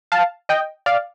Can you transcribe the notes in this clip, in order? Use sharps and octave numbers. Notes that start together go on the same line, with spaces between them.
F5 A5
D#5 G5
D5 F5